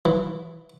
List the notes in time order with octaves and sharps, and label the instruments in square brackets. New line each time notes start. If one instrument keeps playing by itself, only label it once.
[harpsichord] E3